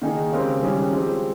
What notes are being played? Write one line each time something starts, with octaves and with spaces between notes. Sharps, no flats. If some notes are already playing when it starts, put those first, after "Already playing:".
D#3 A#3 D#4 G#4
C#3 G#3 C4 G4 A#4
D#3 G3 C#4 G#4
F3 G#3 C4 G4